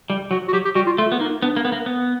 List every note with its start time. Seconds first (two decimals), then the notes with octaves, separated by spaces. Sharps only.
0.10 G3
0.31 F#3 F#4
0.48 F#4
0.53 F#3 G4
0.65 G4
0.75 G3 F#4
0.86 F4
0.97 A3 F4
1.12 B3
1.20 A#3 D#4
1.42 B3 D4
1.56 A#3
1.65 B3
1.72 A#3
1.86 B3